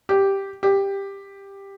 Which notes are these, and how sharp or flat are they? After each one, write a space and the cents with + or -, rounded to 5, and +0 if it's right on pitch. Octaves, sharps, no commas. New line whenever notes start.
G4 +0
G4 +10